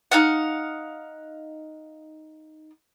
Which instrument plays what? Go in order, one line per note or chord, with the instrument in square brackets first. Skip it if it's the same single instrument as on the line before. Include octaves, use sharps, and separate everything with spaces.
[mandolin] D#4 F5 F#5